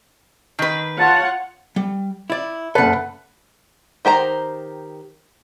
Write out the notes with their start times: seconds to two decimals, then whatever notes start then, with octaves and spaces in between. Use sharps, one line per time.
0.59 D#3 B4
1.00 F4 C#5 F#5 A5
1.76 G3
2.30 E4 D5
2.75 F#1 A4 B4 F#5
4.05 D#3 G4 C5 A#5